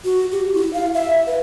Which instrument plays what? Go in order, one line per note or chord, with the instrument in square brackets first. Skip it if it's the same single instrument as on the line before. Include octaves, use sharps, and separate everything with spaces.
[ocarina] F#4
G4
E4
F5
E5
B4